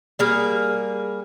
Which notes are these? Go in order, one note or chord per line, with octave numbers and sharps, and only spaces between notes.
G3 A#3 G#4